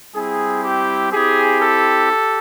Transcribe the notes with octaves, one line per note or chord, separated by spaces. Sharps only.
G3 C4 E4 G#4
G4
C4 E4 G4 G#4
A4
G4